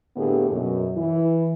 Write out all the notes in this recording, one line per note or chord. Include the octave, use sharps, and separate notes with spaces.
A2 D3 A#3 B3 G4 G#4
F#2 B2
E3 E4